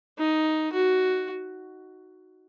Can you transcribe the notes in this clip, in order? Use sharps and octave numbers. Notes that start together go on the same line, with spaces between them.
D#4
F#4